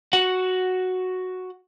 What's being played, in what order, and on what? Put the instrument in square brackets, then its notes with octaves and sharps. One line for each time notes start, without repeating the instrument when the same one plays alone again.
[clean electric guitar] F#4 F#5